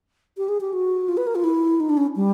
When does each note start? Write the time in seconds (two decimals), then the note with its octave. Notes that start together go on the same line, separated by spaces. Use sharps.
0.37 G4
0.49 G#4
0.61 G4
0.73 F#4
1.09 F4
1.17 B4
1.27 A#4
1.35 F4
1.44 E4
1.80 D#4
1.89 D4
1.97 C#4
2.16 G3